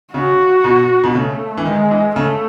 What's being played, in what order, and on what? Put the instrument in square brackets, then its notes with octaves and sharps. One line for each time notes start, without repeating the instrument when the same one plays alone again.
[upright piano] C#3 [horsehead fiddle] F#4
[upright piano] B2
B2
[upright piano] C#3 [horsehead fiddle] A3
[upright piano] E3
[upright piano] D#3 [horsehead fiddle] G#3
[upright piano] E3
[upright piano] C#3 [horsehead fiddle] A3